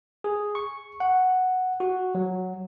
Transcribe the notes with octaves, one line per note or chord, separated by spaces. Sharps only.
G#4
C#6
F#5
F#4
F#3